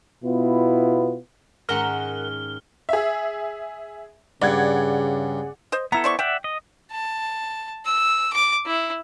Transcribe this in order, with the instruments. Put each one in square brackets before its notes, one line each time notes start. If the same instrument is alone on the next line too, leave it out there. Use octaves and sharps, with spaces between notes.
[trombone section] B2 B3 E4 F4
[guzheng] G#2 D#3 C#4 [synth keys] A#4 F#5 F#6 [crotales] F6 G7
[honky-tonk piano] G#4 E5
[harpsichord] G2 [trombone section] C#3 G#4 [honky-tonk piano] D5 F#5 G#6
[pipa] C5 D#5
[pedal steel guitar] B3 E4 A4 [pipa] A#5
[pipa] C5 D5 C#6
[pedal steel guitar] D5 E5 F#5 [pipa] G5
[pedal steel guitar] D#5
[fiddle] A5
E6
D6
E4